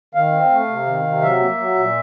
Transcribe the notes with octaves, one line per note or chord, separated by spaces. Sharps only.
D#3 F5
C4
A3
C3
D#3
C3
F#3 E5
A#3
F#3
A#2